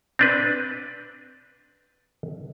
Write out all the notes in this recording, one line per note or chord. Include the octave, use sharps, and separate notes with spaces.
C4 D4 B4